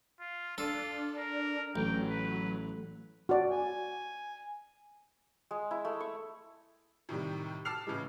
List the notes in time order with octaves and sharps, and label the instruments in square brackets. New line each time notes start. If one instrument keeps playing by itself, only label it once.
[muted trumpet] F4
[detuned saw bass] D4 [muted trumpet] F4 [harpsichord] A4
[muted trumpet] A#4
[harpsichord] A1 [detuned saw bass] F#3 [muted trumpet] G5
[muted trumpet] B4
[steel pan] F#4 D5
[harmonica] G#5
[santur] G#3
E4
A3
C#6
[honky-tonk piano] A2 C3 D#3 G3
A5 D6 E6 F6 C7 F7
A2 C#3 E3 G#3